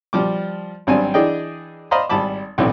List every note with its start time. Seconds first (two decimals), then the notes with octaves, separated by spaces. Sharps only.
0.13 F3 G3 D6
0.87 G#1 F#3 G3 C4 D4 G#5
1.14 E3 D4 G#4 D5 D#5 G5
1.91 C5 D5 D#5 F5 A#5 B5
2.09 G#1 G3 A5 B5 D6
2.58 B1 A2 E3 C4 D5